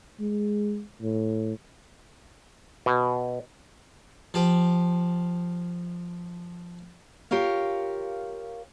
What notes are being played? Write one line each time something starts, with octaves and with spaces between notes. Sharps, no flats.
G#3
A2
B2
F3 G4
F4 G4 A#4 C#5 F5